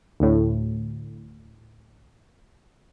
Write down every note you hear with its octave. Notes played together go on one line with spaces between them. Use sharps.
D2 A2